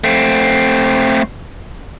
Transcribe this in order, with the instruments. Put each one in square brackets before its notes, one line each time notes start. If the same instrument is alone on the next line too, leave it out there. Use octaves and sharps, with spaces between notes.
[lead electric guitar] A3 C4